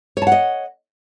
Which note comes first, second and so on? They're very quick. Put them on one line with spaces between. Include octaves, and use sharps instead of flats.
C#5 A5 F#5 D#5